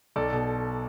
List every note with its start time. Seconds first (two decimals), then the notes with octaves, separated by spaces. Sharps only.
0.16 B1 A4 D5
0.32 B2